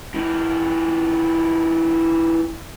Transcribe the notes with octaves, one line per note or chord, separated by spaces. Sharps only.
E3 D#4